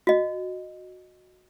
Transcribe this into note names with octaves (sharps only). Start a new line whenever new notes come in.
F#4 D#5